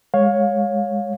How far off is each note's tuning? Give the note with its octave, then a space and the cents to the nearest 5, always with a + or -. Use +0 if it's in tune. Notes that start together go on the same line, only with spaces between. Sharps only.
G#3 -10 C#5 +0 F5 +25